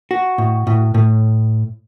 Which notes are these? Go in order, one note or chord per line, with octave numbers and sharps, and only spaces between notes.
F#4
A2
A2
A2